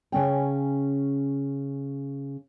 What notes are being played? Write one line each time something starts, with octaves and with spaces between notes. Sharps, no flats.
C#3 C#4 G5